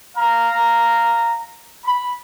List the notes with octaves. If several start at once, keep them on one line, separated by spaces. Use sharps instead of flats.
F5 A#5
B5